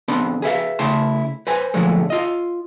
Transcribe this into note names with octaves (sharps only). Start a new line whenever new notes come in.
D#3 B3 C4 D4 B5 C6
G#4 B4 E5 F5
C#3 A3 E4 A5 C6
B4 C5 G#5
A#2 D3 F3 F#3 G#3 A3
F4 D#5